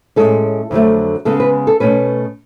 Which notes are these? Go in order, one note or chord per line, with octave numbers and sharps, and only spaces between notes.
A2 G#3 C#4 A4
F2 D3 F#3 A3
C#3 G#3 B3 A4
B4
A4
B2 A3 C#4 B4